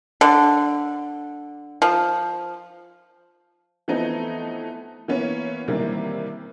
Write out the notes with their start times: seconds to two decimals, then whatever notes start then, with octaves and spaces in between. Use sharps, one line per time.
0.21 D3
1.82 F3
3.88 E3 F3 A3 B3 C4 D#4
5.08 E3 A#3 B3 C#4
5.68 C3 D#3 E3 G3 A#3